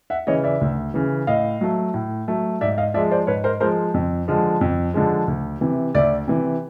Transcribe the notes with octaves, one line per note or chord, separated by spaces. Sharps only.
E5 F#5
C#3 E3 C#5 D#5
D5 E5
D2
C#3 E3
A2 D#5 F5
F#3 A3
A2
F#3 A3
G#2 D5 E5
D#5 F5
F3 G#3 D5 E5
C5 D5
G#2 B4 C#5
A#4 C5
F3 G#3 A#4 C5
F2
D3 F3 G#3
F2
D3 F3 G#3
D2
C3 E3
D2 D5 E5
C3 E3